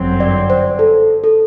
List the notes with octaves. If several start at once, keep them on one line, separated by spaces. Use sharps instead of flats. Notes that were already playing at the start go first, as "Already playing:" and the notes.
Already playing: G1 F#2 F#3 C4
D5
C5
A4
A4